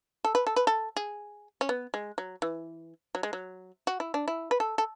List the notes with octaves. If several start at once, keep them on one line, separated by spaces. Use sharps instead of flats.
A4
B4
A4
B4
A4
G#4
C#4
B3
G#3
F#3
E3
F#3
G#3
F#3
F#4
E4
D4
E4
B4
A4
A4